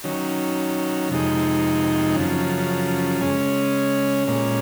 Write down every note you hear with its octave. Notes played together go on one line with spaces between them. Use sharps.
D#3 F#3 C#4
F2 C3 D#3 G#3 D#4
F#2 C#3 F3
C#3 G#3 C#4
A#2 G#3 C#4